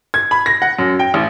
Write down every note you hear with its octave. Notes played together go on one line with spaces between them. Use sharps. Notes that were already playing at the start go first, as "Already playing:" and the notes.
G#6
B5
A#6
F#5
F#2
G5
A1